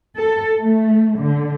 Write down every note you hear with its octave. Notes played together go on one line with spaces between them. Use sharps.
A4
A3
D3